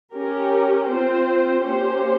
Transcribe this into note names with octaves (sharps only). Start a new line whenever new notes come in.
C#4 G4 A#4
C4 F4 C5
A#3 C#4 G4 C5